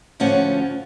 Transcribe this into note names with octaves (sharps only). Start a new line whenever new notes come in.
D2 A2 F3 C#4 F#5